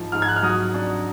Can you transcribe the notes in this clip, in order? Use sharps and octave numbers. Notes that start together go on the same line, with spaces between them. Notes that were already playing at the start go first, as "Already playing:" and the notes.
Already playing: G#2 F3
G#2 F6
G#6
F#6
F6
F#3 D#6
D4